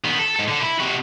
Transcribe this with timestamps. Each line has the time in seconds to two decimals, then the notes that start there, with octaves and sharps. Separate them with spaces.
0.05 D#3 B3
0.19 A4
0.36 G#2 A4
0.48 D3 A4
0.61 E4
0.79 C3 F#4